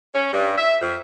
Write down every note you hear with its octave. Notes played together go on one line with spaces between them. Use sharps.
C#4
G2
E5
F2